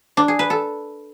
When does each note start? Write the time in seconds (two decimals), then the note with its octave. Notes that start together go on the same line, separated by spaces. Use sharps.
0.17 D4
0.28 G#4
0.39 B4
0.50 A4